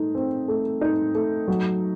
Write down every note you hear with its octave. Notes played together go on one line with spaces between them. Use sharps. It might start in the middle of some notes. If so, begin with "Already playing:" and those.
Already playing: A3 D#4
C4
A3
D#4
A3
F#3